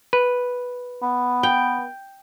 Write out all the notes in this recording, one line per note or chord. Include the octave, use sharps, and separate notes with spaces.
B4
B3
G5